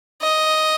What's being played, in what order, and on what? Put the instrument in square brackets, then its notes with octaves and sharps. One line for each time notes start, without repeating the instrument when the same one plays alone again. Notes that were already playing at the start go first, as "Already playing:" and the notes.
[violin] D#5